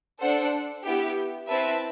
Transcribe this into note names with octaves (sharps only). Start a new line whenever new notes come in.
D4 A4 C5 F#5
B3 E4 G4
C4 E4 B4 E5 A5